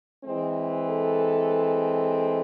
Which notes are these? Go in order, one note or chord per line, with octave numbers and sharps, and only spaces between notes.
E3 G#3 C4
A4